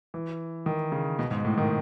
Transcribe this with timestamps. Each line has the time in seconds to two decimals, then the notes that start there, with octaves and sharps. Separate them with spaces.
0.14 E3
0.66 D#3
0.92 C#3
1.19 B2
1.31 G#2
1.45 A2
1.58 D#3